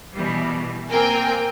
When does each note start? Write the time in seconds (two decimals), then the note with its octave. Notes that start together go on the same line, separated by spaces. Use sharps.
0.13 B2 E3 G3
0.90 A#3 C4 A#4 G5 G#5